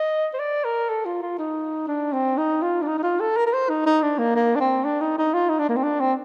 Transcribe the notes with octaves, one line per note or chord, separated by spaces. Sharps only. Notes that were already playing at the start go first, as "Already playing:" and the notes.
Already playing: D#5
C5
D5
A#4
A4
F4
F4
D#4
D4
C4
D#4
F4
D4
D#4
D#4
F4
A4
A#4
A#4
C5
D#4
D#4
D4
A#3
A#3
D4
C4
D4
D#4
D#4
F4
D#4
D4
A#3
C4
D4
C4